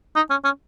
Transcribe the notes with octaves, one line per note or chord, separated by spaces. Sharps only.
D#4
C#4
C#4